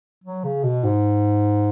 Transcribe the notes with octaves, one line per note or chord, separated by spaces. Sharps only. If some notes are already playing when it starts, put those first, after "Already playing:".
F#3
C#3
B2
G#2